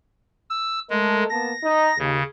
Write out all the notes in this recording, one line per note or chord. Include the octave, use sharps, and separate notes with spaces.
E6
G#3 A3 A4 A#4
A#3 B3 A5 A#6
D#4
D#2 C#3